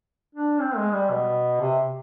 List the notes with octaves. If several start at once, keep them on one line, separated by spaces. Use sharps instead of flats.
D4
C4
G#3
G3
B2
C3